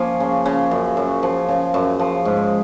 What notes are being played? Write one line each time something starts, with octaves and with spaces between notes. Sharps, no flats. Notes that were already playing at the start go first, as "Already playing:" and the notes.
Already playing: F3 A#3 C#4
C#3
C#3
F#2
F#2
F3
C#3
F#2
F3
G#2